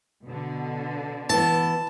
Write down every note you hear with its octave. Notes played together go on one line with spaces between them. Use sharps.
B2 D3
E3 B3 A5